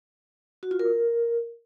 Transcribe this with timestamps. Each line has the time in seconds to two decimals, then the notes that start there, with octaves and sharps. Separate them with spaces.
0.63 F#4
0.71 F4
0.79 A#4